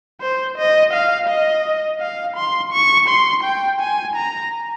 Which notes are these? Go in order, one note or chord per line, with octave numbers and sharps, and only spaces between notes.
C5
D#5
F5
D#5
F5
C6
C#6
C6
G5
G#5
A#5